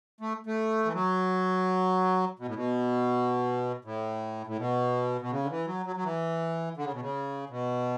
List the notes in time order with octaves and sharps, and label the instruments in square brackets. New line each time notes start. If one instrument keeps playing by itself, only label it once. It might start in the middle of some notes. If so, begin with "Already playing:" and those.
[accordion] A3
A3
E3
F#3
B2
A2
B2
A2
A2
B2
B2
C#3
D3
E3
F#3
F#3
F#3
E3
D3
C#3
B2
C#3
B2